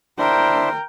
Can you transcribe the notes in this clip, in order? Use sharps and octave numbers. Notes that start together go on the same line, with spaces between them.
D4 E4 A#4 C5 G5